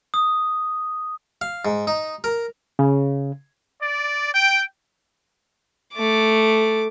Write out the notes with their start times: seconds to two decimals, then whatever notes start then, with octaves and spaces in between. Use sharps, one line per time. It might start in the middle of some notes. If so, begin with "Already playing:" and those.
0.14 D#6
1.41 F5
1.65 G#2
1.87 D#4
2.24 A#4
2.79 C#3
3.82 D5
4.34 G5
5.95 A3 D6